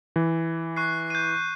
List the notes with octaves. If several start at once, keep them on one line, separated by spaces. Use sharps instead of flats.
E3
C#6 F#6 C7
G6 D#7